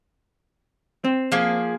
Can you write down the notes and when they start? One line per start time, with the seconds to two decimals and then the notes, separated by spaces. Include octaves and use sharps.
1.04 C4
1.32 F3 A#3 G#4